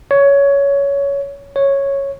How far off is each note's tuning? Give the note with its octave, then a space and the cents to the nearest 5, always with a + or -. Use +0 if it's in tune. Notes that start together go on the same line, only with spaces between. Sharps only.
C#5 +15
C#5 -5